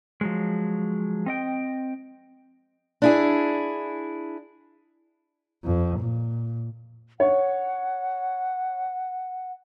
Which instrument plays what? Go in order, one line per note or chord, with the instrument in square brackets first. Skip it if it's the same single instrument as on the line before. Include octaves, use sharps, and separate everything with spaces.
[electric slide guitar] F3 F#3 G#3
C4 D#5 G5
[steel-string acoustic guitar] D4 E4 G#4
[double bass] F2
A#2
[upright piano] C#5 [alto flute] F#5